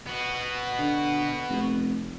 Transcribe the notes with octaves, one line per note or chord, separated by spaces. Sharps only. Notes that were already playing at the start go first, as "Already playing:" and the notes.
B3 F#4
D3
F1